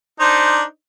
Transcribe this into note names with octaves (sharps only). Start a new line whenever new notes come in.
D4 D#4 C5